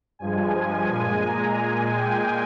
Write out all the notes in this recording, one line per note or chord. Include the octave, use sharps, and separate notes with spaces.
G2 F3 G#3 G#5
A#2 G#3
A#5
A#2 G#3 G#5
G5